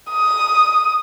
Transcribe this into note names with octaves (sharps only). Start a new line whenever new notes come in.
D#6